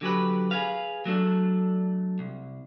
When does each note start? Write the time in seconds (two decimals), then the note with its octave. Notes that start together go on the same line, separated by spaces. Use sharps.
0.01 D3 F#3 G4 B4
0.51 G#4 B4 F5
1.05 F#3 A3 D4
2.19 C2